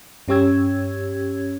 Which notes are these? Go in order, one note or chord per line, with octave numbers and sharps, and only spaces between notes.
G2 C#4 G4 C#5 E6 G#6